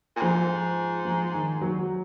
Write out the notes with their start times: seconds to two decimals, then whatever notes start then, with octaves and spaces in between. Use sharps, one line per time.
0.16 A#2
0.22 G#2 F3
1.05 F3
1.34 D#3
1.61 F#3